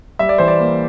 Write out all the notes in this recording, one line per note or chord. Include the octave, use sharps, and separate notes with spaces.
G3 E5
D5
E3 C5
D5
A#3